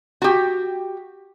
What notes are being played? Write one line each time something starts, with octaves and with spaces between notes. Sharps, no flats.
F#4 G4